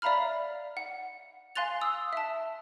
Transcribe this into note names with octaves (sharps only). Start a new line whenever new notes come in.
D5 E5 F5 A#5 B5 F6
F#5
F5 G#5 C6 F#6 A6 F7
D#6 E6 F7
E5 A5